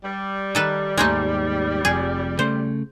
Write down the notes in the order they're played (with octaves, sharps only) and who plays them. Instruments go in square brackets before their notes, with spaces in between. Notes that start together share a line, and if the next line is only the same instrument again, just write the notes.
[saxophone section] G3
[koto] D#3 A4 B4
[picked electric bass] D#2 G#2 [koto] G#3 A3 D#4
[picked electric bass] F1 F2 [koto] G#4
[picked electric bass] C#3 A3 [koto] C5